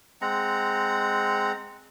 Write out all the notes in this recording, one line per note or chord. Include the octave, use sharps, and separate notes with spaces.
G#3 C4 F#5 A#5